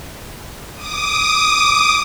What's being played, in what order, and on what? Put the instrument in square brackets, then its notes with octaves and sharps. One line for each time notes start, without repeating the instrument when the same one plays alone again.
[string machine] D6 D#6